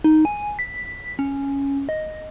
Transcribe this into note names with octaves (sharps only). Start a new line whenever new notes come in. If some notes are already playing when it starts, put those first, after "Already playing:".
D#4
G#5
B6
C#4
D#5